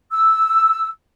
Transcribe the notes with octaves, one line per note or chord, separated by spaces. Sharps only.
E6